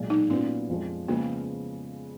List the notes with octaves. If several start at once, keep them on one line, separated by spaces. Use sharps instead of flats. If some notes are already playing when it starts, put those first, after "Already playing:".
Already playing: B1 A#2 G#3
D#4
A#2 F#3 B3 C#4 F4
F2 F3 G#3
C#3 F3 G#3 A#3 B3